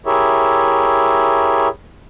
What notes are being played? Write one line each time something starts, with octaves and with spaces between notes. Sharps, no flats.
E4 G4 G#4 A#4 C#5 E5